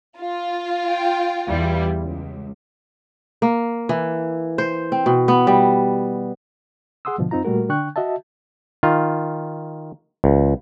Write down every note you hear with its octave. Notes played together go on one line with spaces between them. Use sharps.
F4
G5
E2 G3 E4
C#2
A#3
E3
C5
C4
B2
B3
G3
G#4 F#5 C6 D#6 E6
G#2 B2 D3 F3
F#2 C4 D#4 F4 A#5
A#2 G3 A3 F#4 A#4
D3 D4 G5 C#6 F#6
F#4 D#5 E5 A5
D#3 F4
C#2